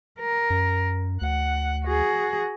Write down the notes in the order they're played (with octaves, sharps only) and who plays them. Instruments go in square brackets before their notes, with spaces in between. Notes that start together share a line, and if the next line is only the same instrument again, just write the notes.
[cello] A#4
[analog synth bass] F#2
[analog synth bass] D2 [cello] F#5
[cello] F#4 G#4